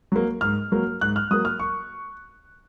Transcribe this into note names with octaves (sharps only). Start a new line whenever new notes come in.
F#3 A#3
G#2 F6
F#3 A#3
G#2 F#6
F6
F#3 A#3 D#6
F6
C#6